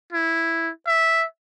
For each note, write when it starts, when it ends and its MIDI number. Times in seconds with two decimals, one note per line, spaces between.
0.12 0.70 64
0.87 1.25 76